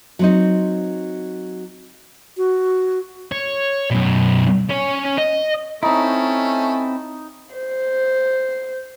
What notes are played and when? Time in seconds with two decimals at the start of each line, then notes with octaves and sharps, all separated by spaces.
0.19 F#3 C4 D#4
2.37 F#4
3.32 C#5
3.91 F#2 B2
4.69 C#4 C#5
5.18 D#5
5.83 A3 C4 C#4 D#4 E4
7.54 C5